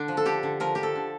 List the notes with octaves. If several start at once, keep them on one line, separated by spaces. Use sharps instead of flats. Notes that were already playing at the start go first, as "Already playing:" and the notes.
Already playing: D3 D4
F3
A4
D3 G4
D3
F3 A#4
F3 G4
A4
D3